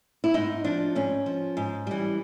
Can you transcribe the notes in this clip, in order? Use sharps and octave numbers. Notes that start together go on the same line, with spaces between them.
E4
G#2 D#4
F3 D4
G#2 C#4
F3
G#2
E3 G3